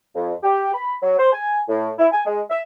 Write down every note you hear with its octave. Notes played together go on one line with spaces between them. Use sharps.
F2
G4
B5
F#3
C5
G#5
A2
E4
G#5
G#3
E5